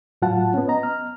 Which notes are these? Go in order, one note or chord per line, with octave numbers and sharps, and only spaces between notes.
A2 F#3 F4 F#5 A5
B3 C#4
B3 D#5 A#5
F6